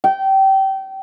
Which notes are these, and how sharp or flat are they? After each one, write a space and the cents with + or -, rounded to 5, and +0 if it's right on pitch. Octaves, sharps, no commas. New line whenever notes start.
G5 -25